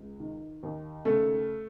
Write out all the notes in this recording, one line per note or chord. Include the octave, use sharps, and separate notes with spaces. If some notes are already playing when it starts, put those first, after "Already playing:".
Already playing: C#2
D#3
D#2
C#3 A3 A4